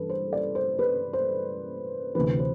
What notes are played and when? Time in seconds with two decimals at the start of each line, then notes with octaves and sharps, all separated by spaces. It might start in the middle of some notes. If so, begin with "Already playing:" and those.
Already playing: G2 E3 A4 B4
0.09 C5
0.33 D5
0.55 C5
0.79 B4
1.13 C5
2.15 D2 C3 E3 B4
2.39 C5